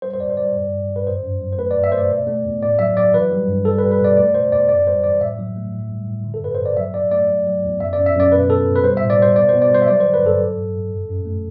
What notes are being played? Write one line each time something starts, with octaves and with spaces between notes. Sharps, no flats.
G3 C5
C5
E2 D5
C5
G3 D5
G2
G2
G2
B4
F#2 C5
F#2
F#3
C5
A3 B4
G2 D5
E5
A3 C5
D5
B2
A3
E2
A2 D5
F#3 E5
F#3 D5
E3 B4
G3
G2
G3 A4
B4
G3
B4
B2 D5
A3 D5
B2 C5
E2 D5
F#2 D5
G3 C5
E3 D5
A2 E5
F#3
A3
A2
G3
A2
D3
A4
G2 B4
G2 C5
D5
F#3 E5
F#3 D5
A3 D5
F#3
F#3
E2
F#2 E5
F#2 D5
E5
F#2
D5
B2 B4
B2 A4
B2
B4
G3 C5
A2 E5
D5
G3 C5
B2 D5
B2 C5
D5
G3 C5
E5
F#3 D5
D3 C5
B4
G2 A4
F#3
G2
G2
F#2
F#2
A3